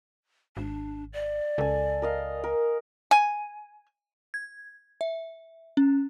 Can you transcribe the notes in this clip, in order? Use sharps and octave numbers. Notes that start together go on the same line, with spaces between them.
G#1 D4
D5
C#2 A4 G#5
A#4 D#5 F5
A#4
G#5
G#6
E5
C#4